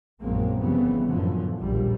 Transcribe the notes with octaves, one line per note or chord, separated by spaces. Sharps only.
A#1 F#2 F#3 G#3 A#3 C4
F1 C#3 E3 G3 B3
F#2 A2 D3 E3 F3
A#1 D#2 G3